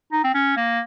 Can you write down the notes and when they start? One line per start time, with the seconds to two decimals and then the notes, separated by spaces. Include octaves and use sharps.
0.12 D#4
0.24 C4
0.34 C#4
0.57 A#3